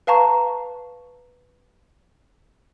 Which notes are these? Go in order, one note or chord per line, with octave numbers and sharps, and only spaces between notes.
B4 F5 A5 A#5 C#6